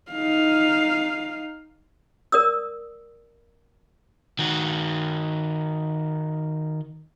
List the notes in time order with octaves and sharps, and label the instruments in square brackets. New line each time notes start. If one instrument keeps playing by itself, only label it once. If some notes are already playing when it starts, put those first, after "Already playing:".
[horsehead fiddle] D#4 F5
[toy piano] A#4 D5 D#6 E6
[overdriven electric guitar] D#3 F#4